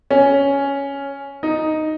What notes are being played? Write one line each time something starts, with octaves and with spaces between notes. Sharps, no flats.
C#4
D#4